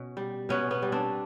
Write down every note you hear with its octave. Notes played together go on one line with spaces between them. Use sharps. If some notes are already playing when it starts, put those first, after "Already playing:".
Already playing: B2 C#4
G3
B2 B3 C#4
B3 C#4
G3
C4 D4